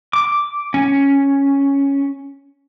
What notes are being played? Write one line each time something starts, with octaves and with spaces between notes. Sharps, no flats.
D6
C#4